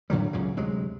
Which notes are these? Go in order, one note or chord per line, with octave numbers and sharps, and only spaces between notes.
A2 D3 F#3 G3
C#2 F#2 A#2 C#3
D2 C3 F#3 G#3